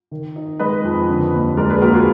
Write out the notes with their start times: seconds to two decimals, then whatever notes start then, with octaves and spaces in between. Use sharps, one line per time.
0.11 D#3
0.36 D#4
0.59 G#3 B4 D#5
0.84 F2
1.09 D3
1.33 D#2
1.57 G#3 A#4 D5
1.70 G#4 B4
1.82 D#2 F#4 A#4
1.94 F4 G#4